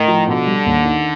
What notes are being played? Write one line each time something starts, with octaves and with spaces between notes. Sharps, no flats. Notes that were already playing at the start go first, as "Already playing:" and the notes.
Already playing: A2 D#3
F3
B2 D3
G3
D#2
D#3